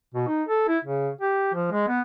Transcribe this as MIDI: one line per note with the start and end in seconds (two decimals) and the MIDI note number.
0.14 0.27 47
0.27 0.43 63
0.48 0.66 69
0.68 0.78 64
0.85 1.09 49
1.21 1.49 67
1.54 1.71 53
1.71 1.86 56
1.88 2.01 59